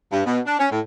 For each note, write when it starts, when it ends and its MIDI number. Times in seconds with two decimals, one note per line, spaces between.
0.12 0.23 43
0.25 0.40 47
0.46 0.59 62
0.59 0.67 61
0.71 0.80 45